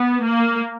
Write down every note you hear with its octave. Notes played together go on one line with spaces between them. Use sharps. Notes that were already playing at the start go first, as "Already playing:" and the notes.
Already playing: B3
A#3